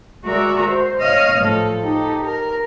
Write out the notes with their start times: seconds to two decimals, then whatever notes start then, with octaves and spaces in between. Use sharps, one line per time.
0.25 G#3 F#4 A#4 D5 E5 A#5
0.66 C5
1.00 C#5 D#5 F5 D#6 F6
1.40 A2 F3 A4
1.84 D#4 G4 A4
2.24 A#4